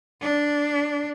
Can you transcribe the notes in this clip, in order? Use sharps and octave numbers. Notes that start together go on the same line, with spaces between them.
D4